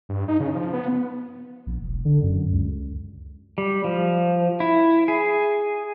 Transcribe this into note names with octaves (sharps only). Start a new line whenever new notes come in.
G2
D#4
C#3
F3
B3
A#1
E1
D3
F#2
C#2
G3
F3
E4
G#4